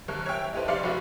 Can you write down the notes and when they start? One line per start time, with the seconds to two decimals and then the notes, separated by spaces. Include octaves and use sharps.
0.08 F#1 D#2 A#4 F#6
0.25 C#5 E5 G5
0.53 D#4 E4 G4 A4 B4 C5
0.68 F1 G4 D5 F5 C6 C#7
0.83 F1 F#4